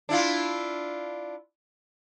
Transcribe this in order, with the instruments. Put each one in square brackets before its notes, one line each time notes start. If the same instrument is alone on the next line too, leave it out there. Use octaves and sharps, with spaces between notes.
[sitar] D4 E4 F4